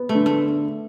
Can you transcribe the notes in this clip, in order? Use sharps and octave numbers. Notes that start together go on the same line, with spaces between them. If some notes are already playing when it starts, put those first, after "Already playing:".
Already playing: B3
A3
D3
A3